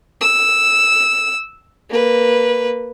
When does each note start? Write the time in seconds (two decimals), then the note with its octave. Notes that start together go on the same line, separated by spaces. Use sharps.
0.21 E6
1.90 A#3 B4